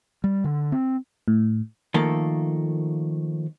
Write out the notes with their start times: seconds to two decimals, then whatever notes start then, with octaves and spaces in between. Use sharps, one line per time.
0.24 G3
0.44 D3
0.72 C4
1.28 A2
1.94 D#3 F3 A3 A#3 A4